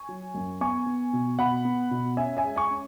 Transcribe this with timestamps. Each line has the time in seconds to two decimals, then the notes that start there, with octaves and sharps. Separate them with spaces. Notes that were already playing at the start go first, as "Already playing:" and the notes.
Already playing: G#5 C#6
0.09 F#3
0.34 F#2
0.61 B3 G#5 C#6
0.86 B3
1.13 B2
1.39 B2 F#5 B5
1.65 B3
1.91 B2
2.17 C#4 E5 G#5
2.37 E5 G#5
2.44 G#3
2.56 G#5 C#6
2.70 C#4